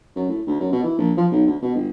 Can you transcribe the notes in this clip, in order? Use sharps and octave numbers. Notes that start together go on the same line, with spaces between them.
F#2
A2
D2
F#2
B2
E3
A#1
F3
B1
D2
B2
G1